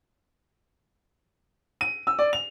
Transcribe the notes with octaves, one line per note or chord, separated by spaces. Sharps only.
D#7
E6
D5
F7